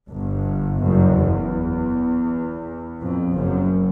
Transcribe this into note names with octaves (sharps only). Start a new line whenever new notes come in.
G1 G2
F#1 F#2
E2
F2
F#1 F#2